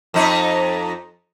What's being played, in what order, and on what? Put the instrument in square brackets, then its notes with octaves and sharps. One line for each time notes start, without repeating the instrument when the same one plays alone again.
[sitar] F2 D#4